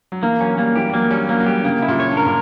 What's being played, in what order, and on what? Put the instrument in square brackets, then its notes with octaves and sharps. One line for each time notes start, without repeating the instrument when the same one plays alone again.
[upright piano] F#3
[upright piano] E3 [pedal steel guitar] A#3
[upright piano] F#3 [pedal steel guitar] C#4
[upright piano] G3 [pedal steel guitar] A#3
[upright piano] E3 [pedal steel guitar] G4
[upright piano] G3
[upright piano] F#3 [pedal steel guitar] A#3
[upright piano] G3 [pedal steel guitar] C#4
[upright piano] F#3 [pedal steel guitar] A#3
[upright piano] F#3
[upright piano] G3 [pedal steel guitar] G4
[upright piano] D3
[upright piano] C#3 [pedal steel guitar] A#3
[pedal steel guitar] E4
[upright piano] A#2
[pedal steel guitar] C#5
[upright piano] G2
[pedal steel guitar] A#4
[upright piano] A#2